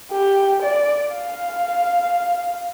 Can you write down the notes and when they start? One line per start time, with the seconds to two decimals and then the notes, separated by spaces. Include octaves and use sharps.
0.12 G4
0.62 D5
1.14 F5